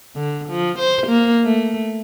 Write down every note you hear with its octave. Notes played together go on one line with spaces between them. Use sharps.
D3
F3
C5
A#3
A3